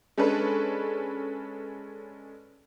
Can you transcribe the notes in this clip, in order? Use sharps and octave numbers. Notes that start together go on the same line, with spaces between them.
G#3 C#4 D4 A4 B4